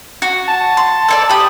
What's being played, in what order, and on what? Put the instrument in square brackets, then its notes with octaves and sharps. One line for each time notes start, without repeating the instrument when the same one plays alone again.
[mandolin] F#4
[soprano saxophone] A5
[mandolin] C6
A4 C#5 D5
[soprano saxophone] G4 [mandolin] B5 D#6